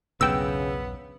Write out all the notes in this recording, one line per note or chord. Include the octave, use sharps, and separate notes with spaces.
B1 E2 G2 C#3 B3 G5 E6